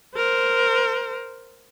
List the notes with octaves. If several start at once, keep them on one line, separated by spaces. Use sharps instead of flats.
A#4 C5